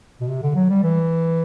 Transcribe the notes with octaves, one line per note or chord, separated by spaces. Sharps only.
B2
C3
D3
F#3
G3
E3